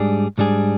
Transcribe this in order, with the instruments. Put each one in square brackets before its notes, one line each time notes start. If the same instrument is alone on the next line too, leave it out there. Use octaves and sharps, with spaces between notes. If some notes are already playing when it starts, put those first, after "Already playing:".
Already playing: [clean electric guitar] G#2 G3 D4 G#4
G#2 G3 D4 G#4